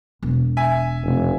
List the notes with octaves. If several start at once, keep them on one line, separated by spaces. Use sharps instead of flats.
E1
E5 G#5
F1